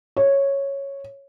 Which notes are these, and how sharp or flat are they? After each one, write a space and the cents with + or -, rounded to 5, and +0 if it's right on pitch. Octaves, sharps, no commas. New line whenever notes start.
C#5 -5